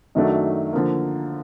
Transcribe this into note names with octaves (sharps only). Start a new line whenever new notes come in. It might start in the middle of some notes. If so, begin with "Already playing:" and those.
F#2 D#3 F#3 A3 D4
D3 F3 A#3